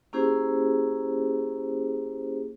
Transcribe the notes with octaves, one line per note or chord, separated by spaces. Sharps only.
A#3 C#4 E4 G4 G#4 C5